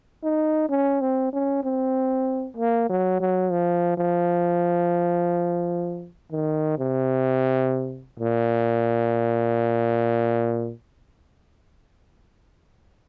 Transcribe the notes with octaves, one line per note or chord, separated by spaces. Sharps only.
D#4
C#4
C4
C#4
C4
A#3
F#3
F#3
F3
F3
D#3
C3
A#2